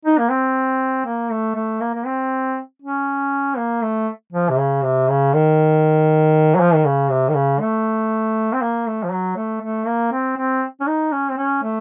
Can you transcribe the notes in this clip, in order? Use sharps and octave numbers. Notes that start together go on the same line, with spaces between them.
D#4
A#3
C4
A#3
A3
A3
A#3
A#3
C4
C#4
A#3
A3
F3
C3
C#3
C3
C#3
D#3
F#3
F3
D#3
C#3
C3
D#3
C#3
A3
C4
A#3
A3
F3
F#3
A3
A3
A#3
C4
C4
C#4
D#4
C#4
C4
C#4
A3